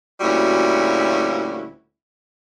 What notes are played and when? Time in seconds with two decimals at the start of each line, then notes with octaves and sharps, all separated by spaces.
0.21 D2 A#2 G3 C#4 E4 F#4